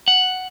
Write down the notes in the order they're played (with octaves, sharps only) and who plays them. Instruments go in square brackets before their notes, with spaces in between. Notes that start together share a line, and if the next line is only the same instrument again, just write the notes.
[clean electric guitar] F#5